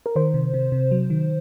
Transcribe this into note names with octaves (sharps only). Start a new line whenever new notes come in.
A#4
D#3 C5
C3
C3
C3
F#3
D#3